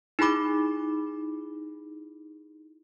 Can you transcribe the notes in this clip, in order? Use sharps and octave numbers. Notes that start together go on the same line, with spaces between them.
D#4 E4 G#4 B5 D6